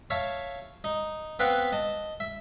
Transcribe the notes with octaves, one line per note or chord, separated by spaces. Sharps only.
C#5 E5 F5 A5
D#4
B3 C4 B4 F5 F#5
D#5 A5
E5